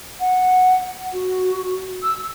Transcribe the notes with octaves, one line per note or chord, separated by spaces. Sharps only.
F#5
F#4
E6